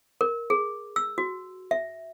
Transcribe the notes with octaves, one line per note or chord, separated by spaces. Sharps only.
A#4
G#4
E6
F#4
E5